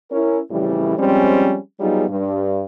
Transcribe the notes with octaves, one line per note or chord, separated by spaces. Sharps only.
C#4 E4 A#4
F2 A2 C#3 E3 G3
F3 G3 G#3 C4 C#4
F#3 G3 B3 D#4 F4 G#4
G2